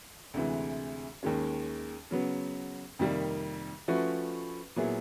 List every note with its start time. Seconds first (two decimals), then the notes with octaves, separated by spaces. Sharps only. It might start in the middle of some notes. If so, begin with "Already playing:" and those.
0.34 D2 C3 E3 G#3
1.23 D#2 D#3 G#3 C#4
2.11 C#3 F#3 B3
2.99 F2 C3 D#3 G3 A#3
3.88 F3 A3 C#4 F#4 B4
4.76 A#2 F#3 B3 E4 G#4